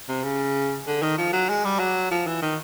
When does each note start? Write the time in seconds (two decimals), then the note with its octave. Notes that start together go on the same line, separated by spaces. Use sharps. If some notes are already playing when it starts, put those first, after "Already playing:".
0.09 C3
0.24 C#3
0.87 D3
1.02 D#3
1.18 F3
1.33 F#3
1.49 G#3
1.64 G3
1.79 F#3
2.11 F3
2.27 E3
2.42 D#3